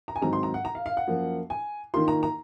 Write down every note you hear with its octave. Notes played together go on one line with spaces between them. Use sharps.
A#5
G#5
G#2 D#3 F#3 C4 A#5
C6
A#5
F#5
A#5
F5
F5
F#5
F#2 F3 A#3
G#5
D#3 A#3 F4 C6
A#5
A#5